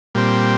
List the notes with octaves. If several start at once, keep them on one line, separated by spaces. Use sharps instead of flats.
A#2 G3 C4